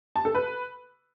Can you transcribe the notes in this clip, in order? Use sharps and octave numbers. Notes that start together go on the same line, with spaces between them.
A5
A4
B4